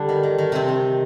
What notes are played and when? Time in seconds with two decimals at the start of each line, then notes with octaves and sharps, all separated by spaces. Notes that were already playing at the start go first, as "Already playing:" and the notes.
Already playing: D3 G3 D4 G4
0.09 D#3
0.23 D#3
0.38 D#3
0.52 C3 D#3 C4
0.68 D#3